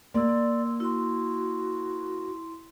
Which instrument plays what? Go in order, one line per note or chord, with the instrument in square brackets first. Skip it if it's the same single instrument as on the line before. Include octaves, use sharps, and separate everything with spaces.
[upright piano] A#3 [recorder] D5 [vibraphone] C6 E6
[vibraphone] E4 C6 [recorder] F#4